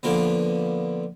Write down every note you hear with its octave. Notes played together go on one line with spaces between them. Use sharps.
D3 F3 A#3 B3